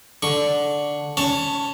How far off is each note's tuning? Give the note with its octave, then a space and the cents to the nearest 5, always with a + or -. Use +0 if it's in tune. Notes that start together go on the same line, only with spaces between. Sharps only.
D3 -5 C#6 +0
C#4 +25 C#5 +0 A5 +10